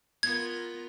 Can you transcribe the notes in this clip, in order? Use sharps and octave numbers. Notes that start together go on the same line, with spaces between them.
B3 F4 A#4 G#6